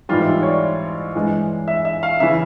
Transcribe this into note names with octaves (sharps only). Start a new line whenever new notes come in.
G#2 E3 G3 F4
E4
C#5
D5
G2 E3 G#3
E5
E5
F5
C#3 E3 E5